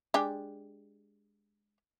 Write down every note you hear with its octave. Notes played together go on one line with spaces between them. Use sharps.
G#3 D4 G4